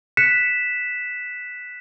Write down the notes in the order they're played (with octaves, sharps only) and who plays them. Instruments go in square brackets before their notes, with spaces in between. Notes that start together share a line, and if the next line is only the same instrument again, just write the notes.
[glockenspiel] F#6 B6 C#7 E7